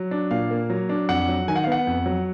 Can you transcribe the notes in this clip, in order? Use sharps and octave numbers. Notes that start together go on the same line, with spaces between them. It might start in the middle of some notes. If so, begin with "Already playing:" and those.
Already playing: F#3
D4
A#2 F5
A#3
F#3
D4
F2 F#5
F#3
D#3 G#5
F#5
F5
B3 F#5
F2
F#3